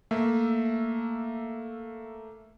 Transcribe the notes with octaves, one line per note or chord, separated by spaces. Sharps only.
A3 A#3 E5